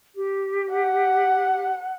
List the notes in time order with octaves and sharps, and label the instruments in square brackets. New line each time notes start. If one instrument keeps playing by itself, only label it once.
[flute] G4
[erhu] F#5